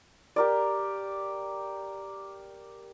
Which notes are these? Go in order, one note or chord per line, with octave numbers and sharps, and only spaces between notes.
G4 A#4 D5